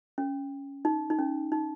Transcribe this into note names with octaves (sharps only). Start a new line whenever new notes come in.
C#4
D#4
D#4
C#4
D#4